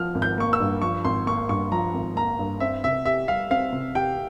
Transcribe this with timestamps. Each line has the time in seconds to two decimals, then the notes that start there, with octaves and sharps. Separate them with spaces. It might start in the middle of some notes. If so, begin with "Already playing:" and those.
Already playing: F3 F6
0.15 G#1
0.22 G6
0.38 A#3 C#6
0.53 E6
0.60 G2
0.82 F3 C#6
1.04 G#1 C6
1.27 A#3 C#6
1.49 G2 C#6
1.72 F3 A#5
1.94 G#1
2.16 A#3 A#5
2.39 G2
2.60 C4 E5
2.84 C3 E5
3.06 G4 E5
3.28 G3 F5
3.51 C4 F5
3.72 C3
3.95 G4 G5